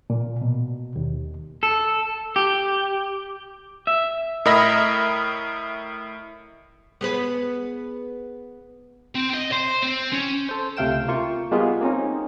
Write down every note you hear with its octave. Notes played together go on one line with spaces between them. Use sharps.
A#2
B2
D#2
A4
G4
E5
A2 A#4 D#5 E5 B5 A#6
B3 G#4 B4
C4
D#5
C5
C4
C#4
A4 C5
C#2 C3 A3 F5 G5 E7
A#3 F4 C#6
G3 G#3 A#3 B3 F4 G#4
A#3 C4 C#4 D#4